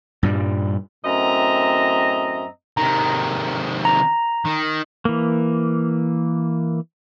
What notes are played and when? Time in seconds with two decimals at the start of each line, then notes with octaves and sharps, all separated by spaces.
0.23 G2 A#2 G3
1.05 F#2 A2 C4 D#5 E5 A#5
2.77 C3 D#3 A#5
3.85 A#5
4.45 D#3
5.05 E3 A#3